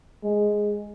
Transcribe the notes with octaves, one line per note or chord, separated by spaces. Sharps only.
G#3